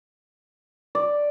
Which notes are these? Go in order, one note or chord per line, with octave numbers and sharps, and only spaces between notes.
D5